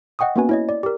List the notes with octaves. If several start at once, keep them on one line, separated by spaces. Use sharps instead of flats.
D#5 F#5 G5 C#6 D#6
A#3 B3 C#4 F#4 B4 G#5
E4 C#5 D#5
D5
G4 A#4